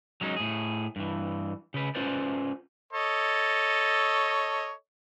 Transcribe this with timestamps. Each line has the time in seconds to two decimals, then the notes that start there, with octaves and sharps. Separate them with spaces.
0.21 F#3 G#3 C#4 D#4
0.36 A2 G#4
0.96 G2 E3
1.74 C#3 B4
1.95 C#4 F4 B4 C5 D5
2.93 A4 C#5 D#5